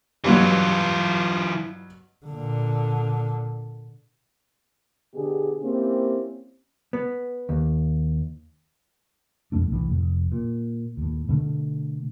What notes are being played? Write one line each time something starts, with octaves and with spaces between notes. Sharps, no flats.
G2 B2 E3 F#3 F4
A#2 D3
B2 D3 G4 G#4
A#3 C4 C#4 E4 G4
B3
D#2
F2 B2 A3 D4
C2 A2 E3
F1
A#2
D#2 A2
B2 D3 A3